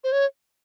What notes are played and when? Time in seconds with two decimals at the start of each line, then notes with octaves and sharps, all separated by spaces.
0.04 C5
0.12 C#5